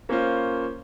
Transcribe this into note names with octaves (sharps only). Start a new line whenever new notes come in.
A#3 C#4 F4 C5